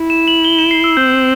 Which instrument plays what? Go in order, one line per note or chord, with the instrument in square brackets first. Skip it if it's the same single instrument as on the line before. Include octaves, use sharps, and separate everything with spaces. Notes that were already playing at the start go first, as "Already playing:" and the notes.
Already playing: [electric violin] E4
[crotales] E7
F#7
G7
E7
C7
E6
[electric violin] C4 [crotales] G6